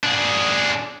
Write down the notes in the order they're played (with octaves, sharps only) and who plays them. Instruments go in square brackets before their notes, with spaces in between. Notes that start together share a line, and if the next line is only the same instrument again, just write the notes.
[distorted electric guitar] D4 G#4